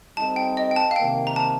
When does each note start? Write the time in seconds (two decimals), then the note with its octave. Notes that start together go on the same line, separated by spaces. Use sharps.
0.17 G3 C4 D#4 A4 A5
0.36 G5
0.57 D#5
0.71 G5
0.76 A5
0.91 F5
0.96 C3 D#3 A#3 G5
1.27 A#5
1.36 A5